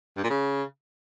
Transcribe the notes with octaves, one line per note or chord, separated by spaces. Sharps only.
G2
A#2
C#3